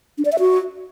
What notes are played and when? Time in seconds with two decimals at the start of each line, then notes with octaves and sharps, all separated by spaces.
0.18 D4
0.25 D5
0.32 E5
0.39 F#4